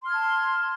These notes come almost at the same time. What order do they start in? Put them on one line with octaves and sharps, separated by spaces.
C6 F6 G#6 A5